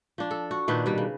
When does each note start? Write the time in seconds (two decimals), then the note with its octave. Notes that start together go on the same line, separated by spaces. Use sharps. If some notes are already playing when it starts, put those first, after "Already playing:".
0.18 F3 D4
0.31 A4
0.51 F#4
0.68 A#2 D#3 D4 B4
0.86 B2 G3
0.98 C#3